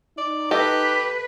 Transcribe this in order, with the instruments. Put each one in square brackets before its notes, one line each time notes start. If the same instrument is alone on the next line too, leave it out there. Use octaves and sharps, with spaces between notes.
[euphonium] D#4 [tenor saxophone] D5
[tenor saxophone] G4 [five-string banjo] A4 D#5 [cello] B4